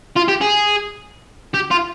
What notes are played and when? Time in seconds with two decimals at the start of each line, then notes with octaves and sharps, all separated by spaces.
0.17 F4
0.28 G4
0.41 G#4
1.54 G4
1.71 F4